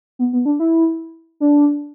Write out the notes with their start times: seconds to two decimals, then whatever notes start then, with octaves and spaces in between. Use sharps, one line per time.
0.19 B3
0.33 B3
0.45 D4
0.60 E4
1.40 D4